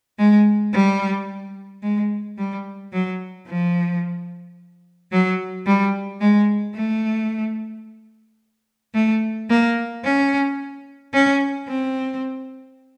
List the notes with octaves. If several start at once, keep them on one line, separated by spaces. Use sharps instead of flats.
G#3
G3
G#3
G3
F#3
F3
F#3
G3
G#3
A3
A3
A#3
C#4
C#4
C4